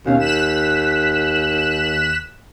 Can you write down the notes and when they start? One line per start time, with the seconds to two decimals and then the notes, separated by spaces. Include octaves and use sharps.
0.06 D#2 B2 C#4 F5
0.19 F#6 B6 E7